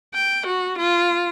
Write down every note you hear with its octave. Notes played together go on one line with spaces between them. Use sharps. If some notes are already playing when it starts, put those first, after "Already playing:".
G5
F#4
F4